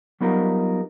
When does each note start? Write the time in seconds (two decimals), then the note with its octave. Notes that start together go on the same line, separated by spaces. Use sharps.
0.21 F#3 G3 B3 D#4 F4 A#4